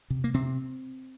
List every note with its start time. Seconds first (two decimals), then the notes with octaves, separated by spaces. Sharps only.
0.10 C3
0.24 A#3
0.34 C3 C4